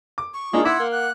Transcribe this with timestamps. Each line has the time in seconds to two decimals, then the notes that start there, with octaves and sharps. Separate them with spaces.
0.18 D6
0.34 C#6
0.53 G#3 A#3 D4 D#4 F4
0.65 E4 F#5 C6 D6 E6 G#6
0.80 A#3
0.92 F#5 F#6